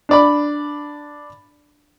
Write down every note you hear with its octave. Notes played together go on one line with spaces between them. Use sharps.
D4 D5 B5